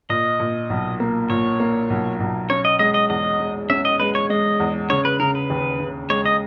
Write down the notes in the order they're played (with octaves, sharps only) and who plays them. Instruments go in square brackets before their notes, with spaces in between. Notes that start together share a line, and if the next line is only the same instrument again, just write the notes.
[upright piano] A#2 [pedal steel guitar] D#5
[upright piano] A#2
B1
A#3
[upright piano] A#2 [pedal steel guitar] C#5
[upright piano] A#3
B1
B1
[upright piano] C#4 [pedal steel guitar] C#5
[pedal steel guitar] D#5
[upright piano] G#3 [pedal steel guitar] D#5
[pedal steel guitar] D#5
[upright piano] E2 [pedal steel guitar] D#5
[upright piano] G#3
[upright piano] C#4 [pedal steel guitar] E5
[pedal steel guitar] D#5
[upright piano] G#3 [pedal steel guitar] B4
[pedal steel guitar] C#5
[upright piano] G#3 [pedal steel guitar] D#5
[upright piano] E2
[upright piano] C#3 [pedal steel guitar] C#5
[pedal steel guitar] B4
[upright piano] C#3 [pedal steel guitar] A#4
[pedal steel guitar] B4
[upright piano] D#2
C#3
[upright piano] G#3 [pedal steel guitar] C#5
[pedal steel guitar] D#5